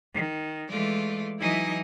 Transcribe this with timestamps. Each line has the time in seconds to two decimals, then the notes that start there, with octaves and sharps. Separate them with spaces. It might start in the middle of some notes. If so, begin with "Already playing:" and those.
0.14 D#3
0.68 E3 G#3 A3 F4 D5
1.40 E3 F#3 D#4 E4 D#5 G#5